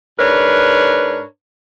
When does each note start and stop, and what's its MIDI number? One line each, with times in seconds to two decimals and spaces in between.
0.19 1.23 44
0.19 1.23 62
0.19 1.23 70
0.19 1.23 71
0.19 1.23 73